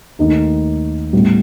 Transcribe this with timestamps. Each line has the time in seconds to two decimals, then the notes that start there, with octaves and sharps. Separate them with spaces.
0.19 D#2 D#3 A3 D#4
1.13 A2 G3 B3